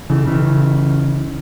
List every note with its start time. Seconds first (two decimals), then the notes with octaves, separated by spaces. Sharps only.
0.10 C#3 E3
0.27 C#3 E3